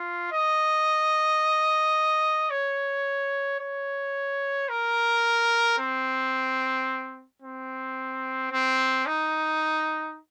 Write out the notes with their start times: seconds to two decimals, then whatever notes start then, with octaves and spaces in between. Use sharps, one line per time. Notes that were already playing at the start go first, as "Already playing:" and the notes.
Already playing: F4
0.32 D#5
2.51 C#5
3.60 C#5
4.69 A#4
5.78 C4
7.42 C4
8.52 C4
9.06 D#4